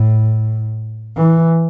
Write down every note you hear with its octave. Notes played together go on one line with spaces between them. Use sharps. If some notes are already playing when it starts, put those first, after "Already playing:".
Already playing: A2
E3